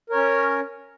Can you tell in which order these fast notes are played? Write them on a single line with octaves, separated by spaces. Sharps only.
A#4 C#5 C#4